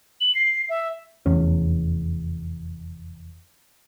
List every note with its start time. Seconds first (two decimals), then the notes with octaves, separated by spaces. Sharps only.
0.21 F#7
0.35 C7
0.69 E5
1.26 F1 E2 C#4